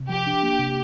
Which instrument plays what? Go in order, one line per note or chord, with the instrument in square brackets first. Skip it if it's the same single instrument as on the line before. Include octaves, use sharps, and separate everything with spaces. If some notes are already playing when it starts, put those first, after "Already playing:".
Already playing: [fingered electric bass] C3
[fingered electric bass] F3 [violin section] G4
[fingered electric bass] D4
A#3
C3